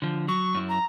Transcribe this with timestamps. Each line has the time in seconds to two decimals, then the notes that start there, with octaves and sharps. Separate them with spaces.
0.02 D3 F3
0.28 F#3 C#6
0.55 F#2 E4
0.69 A#5